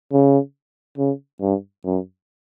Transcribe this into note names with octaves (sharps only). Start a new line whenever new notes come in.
C#3
C#3
G2
F#2